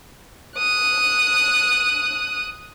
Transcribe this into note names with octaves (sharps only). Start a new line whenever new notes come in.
D#6 F#6